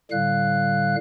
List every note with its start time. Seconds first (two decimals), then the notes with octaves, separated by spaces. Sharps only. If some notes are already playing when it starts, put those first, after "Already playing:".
0.11 A2 D3 G3 F5 F#6